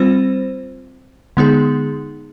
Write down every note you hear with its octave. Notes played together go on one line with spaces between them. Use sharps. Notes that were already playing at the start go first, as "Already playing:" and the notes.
Already playing: G3 C4 F4 C5
D3 G#3 B3 D#4 G#4